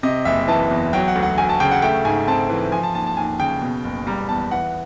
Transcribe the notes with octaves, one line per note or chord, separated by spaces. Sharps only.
C3 D#5
F#1 E5
E3 A5
E2
F#3 G5
F#5
D2
F#5
D2 G#5
A5
C#3 G5
F#5
A3 G5
G#2 G#5
C4 A5
E3
F3 G#5
A5
D#2 A5
A5
D#2 G#5
C#3 G5
B2
F#1
G3 A#5
E2 A5
E3 F#5